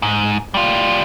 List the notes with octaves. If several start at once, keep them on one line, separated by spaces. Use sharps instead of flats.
G#2
G3 F4